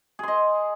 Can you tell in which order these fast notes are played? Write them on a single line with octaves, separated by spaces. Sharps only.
G#4 C6 D#5